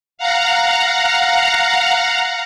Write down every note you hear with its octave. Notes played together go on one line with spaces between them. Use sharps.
F5 F#5 A#5